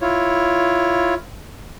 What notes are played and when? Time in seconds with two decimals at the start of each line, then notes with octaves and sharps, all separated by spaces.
0.01 E4 F4 C#5